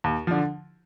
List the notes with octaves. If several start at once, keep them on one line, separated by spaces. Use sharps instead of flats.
D#2
D3 F3